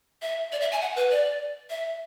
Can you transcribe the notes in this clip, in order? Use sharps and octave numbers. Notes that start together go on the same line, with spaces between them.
E5
D5
E5
G#5
F#5
B4
D5
E5